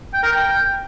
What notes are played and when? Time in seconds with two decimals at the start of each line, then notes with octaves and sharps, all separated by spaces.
0.14 G5
0.23 A#4
0.32 G5